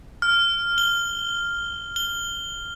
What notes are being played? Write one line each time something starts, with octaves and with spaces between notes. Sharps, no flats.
F6
G7
G7